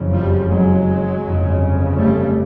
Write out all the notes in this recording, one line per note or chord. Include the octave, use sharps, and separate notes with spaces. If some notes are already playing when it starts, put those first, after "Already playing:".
Already playing: F#1 F2 C#3
F3 G3
F#3 G#3
G1 F2 C#3
G3 A3